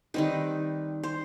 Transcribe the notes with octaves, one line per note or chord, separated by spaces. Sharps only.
D#3 G3 C4 D#4 B4
C5